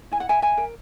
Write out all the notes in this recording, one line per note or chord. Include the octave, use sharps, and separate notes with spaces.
E4 G#5
F#5
E5 G#5
E5 G#5
A#4